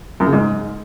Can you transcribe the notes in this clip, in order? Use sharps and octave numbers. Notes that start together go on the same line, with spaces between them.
F#2
C#3
G#2